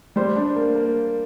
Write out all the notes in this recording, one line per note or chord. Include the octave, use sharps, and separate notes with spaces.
G3 C5
D4
A#3
A#3